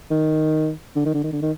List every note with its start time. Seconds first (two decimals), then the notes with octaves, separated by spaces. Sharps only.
0.11 D#3
0.96 D3
1.06 D#3
1.15 D3
1.24 D#3
1.33 D3
1.42 D#3